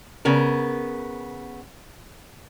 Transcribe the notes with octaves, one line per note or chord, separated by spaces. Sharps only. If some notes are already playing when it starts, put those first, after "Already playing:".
C#3 B3 A#4